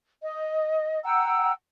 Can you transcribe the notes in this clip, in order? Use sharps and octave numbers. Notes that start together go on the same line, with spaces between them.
D#5
F#5 G5 A#5 E6